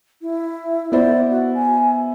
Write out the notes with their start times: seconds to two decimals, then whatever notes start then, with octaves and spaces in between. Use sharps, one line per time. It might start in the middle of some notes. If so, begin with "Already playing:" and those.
0.22 E4
0.92 B3 E4 C5 D5
1.30 F#4
1.54 G#5